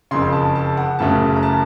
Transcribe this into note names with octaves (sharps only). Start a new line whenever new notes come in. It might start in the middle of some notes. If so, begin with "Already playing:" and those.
F#1 F2 C#3 C6
A5
A5
F#5
F#1 F#2 C#3 A3 A5
A#5
A5